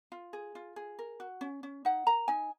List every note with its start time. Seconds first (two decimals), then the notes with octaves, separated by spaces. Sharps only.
0.12 F4
0.33 G#4
0.55 F4
0.76 G#4
0.99 A#4
1.20 F#4
1.41 C#4
1.63 C#4
1.85 D#4 F#5
2.07 A#4 A#5
2.28 D#4 G#5